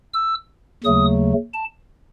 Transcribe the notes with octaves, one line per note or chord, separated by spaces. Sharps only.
E6
D#2 C#3 F#3 A3 D#6
A5